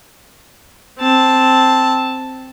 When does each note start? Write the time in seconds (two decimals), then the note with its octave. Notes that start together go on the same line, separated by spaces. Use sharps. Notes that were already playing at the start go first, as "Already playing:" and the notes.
0.98 C4 A5